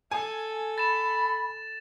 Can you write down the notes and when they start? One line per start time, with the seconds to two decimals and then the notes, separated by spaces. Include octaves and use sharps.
0.11 A4 G#5
0.78 B5 A6 E7